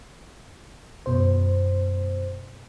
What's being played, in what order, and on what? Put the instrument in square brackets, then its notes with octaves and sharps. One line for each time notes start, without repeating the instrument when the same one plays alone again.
[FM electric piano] F#2 B2 C5